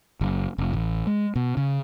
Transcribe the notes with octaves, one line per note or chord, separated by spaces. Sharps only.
F#1
F1
A1
G#3
B2
C#3